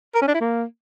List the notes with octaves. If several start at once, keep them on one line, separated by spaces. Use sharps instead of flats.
A#4
C#4
D4
E4
A#3